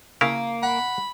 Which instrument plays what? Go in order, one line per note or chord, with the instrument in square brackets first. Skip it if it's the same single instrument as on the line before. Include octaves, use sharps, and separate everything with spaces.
[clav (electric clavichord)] C#3 E4 A#4 [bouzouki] A#3
[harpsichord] F#5 [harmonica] B5